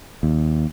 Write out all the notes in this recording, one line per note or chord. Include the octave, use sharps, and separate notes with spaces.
D#2